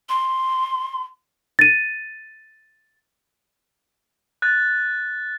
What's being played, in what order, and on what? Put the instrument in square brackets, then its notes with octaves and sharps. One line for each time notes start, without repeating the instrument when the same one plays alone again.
[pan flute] C6
[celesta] A6 D#7
[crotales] F#6 A6